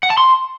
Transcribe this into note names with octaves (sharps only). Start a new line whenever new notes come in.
F#5
A5
C6